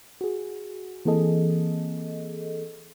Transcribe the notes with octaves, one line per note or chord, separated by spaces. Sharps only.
F#4 G#4
E3 A#3 C4 G#4 A4 D#5